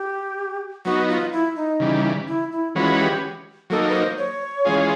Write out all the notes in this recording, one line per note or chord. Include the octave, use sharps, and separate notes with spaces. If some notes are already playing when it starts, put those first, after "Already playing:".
Already playing: G4
F#3 B3 D#4 F#4
F4
E4
D#4
C#3 E3 G3
E4
E4
E3 G#3 C#4 F4 F#4 B4
G4
F#3 A#3 D#4 A4
B4
C5
C#5
E3 G#3 C#4 F4 G#4